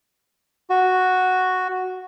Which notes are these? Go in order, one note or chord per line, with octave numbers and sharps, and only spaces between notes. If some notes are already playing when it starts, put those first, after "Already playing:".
F#4